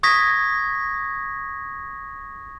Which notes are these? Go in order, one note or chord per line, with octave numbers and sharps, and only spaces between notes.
C#6 D#6 G#6 A#6 B6